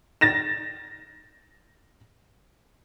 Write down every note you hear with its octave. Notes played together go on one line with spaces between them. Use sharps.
A6 A#6 E7